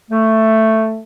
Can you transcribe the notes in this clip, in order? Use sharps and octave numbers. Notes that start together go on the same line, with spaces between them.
A3